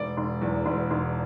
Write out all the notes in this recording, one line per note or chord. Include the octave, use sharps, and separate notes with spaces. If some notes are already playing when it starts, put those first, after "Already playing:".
Already playing: E1 D5
E1
E2
E1
E1